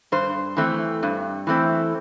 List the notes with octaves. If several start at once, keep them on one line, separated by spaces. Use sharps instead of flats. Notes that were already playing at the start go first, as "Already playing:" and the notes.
G2 C5
E3 A3 C4
G2
E3 A3 C4